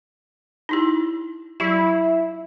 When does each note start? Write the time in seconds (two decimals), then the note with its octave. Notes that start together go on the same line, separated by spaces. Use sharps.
0.69 D#4 E4 G4
1.60 F#3 E4 G4